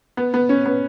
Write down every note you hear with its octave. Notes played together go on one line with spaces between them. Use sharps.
B3
B3
C#4
B3